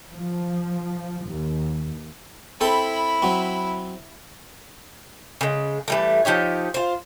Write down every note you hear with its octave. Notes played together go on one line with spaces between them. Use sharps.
F3
D#2
C4 E4 A4 G5 B5
F#3 C4
C#3 G#3
E3 G3 A3
F3 D#4 G4 C#5
F4 C5